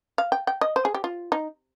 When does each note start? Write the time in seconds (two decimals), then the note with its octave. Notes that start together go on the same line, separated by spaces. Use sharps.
0.18 F5
0.32 G5
0.47 G5
0.61 D#5
0.76 C5
0.85 G#4
0.94 G4
1.04 F4
1.32 D#4